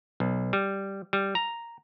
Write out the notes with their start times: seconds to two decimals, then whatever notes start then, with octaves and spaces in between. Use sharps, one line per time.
0.20 B1
0.53 G3
1.13 G3
1.35 A#5